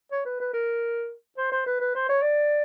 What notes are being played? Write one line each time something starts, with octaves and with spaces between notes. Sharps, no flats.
C#5
B4
B4
A#4
C5
C5
B4
B4
C5
C#5
D5